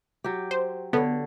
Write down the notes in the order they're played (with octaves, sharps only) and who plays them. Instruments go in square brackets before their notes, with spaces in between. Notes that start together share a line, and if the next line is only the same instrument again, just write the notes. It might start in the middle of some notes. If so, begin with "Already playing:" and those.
[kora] F#3 G4
[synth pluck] C5
[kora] D3 C#5 [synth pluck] B3